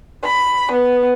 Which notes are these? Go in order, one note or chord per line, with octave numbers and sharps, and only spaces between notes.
B5
B3